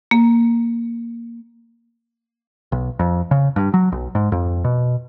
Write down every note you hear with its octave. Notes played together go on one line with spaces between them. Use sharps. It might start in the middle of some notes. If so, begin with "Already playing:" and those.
A#3
B1
F2
C#3
G2
F#3
B1
G#2
F2
B2